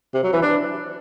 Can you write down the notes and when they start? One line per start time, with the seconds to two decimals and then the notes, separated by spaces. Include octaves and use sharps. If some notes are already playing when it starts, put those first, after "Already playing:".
0.14 C3
0.23 F#3
0.33 E3
0.42 D4